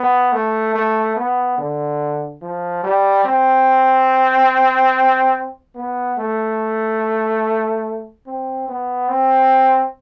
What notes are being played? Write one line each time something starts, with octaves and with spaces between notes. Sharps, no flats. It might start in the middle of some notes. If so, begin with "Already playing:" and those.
Already playing: B3
A3
A3
B3
D3
F3
G3
C4
B3
A3
C4
B3
C4